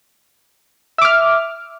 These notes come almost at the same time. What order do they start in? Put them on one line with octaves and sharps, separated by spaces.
E5 D6 F6